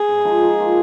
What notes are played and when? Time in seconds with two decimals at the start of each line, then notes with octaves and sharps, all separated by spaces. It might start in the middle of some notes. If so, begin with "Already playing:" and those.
Already playing: G#4
0.08 G#2
0.24 F3 G#3 D#4
0.42 F3
0.58 A#3 F4